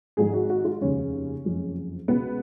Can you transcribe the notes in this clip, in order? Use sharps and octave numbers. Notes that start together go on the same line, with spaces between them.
G#1 G#2 F3 G#3 G#4
F#4
F#4
F4
F1 D#2 C#3 G#3 C#4
F#1 F2 F3 G#3
C#2 B2 G#3 B3